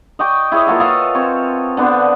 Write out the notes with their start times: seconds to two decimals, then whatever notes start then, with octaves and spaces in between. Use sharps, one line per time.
0.19 D#5 G5 C#6 D6
0.52 E4 G#4 C#5
0.67 A#3 F4 F#4 A4
0.80 A4 B4 D#5 F5
1.15 C4 C#5
1.77 D3 B3 D4 C5